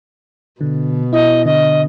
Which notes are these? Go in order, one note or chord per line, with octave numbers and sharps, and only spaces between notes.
B2 D3
E4 D#5
D3 D#5